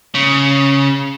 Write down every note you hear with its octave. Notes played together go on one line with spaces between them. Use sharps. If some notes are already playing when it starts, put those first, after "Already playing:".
C#3